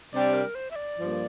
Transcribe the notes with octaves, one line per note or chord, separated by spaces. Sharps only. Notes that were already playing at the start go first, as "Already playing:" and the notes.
C3 G3 D4 G4 D5
A#4
C5
E5
D5
G2 F3 A#3